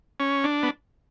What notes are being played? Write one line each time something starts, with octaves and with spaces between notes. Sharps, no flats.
C#4
D4
B3